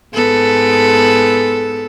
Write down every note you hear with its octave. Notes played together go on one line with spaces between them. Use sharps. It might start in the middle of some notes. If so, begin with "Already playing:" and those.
G#2 B3 A4